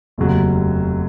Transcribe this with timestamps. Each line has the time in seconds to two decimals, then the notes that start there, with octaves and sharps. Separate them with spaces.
0.18 F1 D#2 C#3 F#3